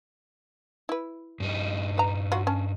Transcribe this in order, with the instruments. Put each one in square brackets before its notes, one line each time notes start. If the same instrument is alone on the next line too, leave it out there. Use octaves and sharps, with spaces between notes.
[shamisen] E4 B4
[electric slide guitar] G2 G3 D#4
[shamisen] B4 A#5
F#3 F4 F#4
C#4 A5